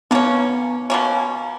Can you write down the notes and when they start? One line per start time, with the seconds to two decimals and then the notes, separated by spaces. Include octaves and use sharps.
0.11 B2 A#3 B3 C#4
0.90 B2 A#3 C#4